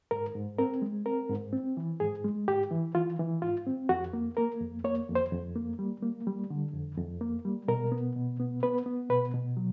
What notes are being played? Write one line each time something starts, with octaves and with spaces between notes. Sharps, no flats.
G#2 A#4
G#2
C4 A#4
G#3
C4 A#4
G#2
C4
E3
G#2 G#4
G#3
G#2 G4
E3
E3 F4
E3
G#2 F4
C4
F2 F#4
A#3
A#3 A#4
F2
A#3 C#5
F2
C5
F2
A#3
G3
A#3
G3
D3
F2
F2
A#3
G3
B2 A#4
B3
B2
B3
B3 B4
B3
B2 B4
B2
F#3